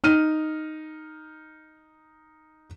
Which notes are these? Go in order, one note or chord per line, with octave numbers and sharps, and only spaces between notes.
D#4 F6 D#7